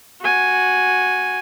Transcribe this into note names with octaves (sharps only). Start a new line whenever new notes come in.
F#4 G#5